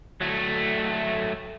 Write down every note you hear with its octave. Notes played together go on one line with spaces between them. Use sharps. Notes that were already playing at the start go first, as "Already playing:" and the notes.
F#3 A3